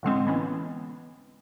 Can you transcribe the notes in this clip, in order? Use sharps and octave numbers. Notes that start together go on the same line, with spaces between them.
A2 D3 G#3 C4
E3 B3 C#4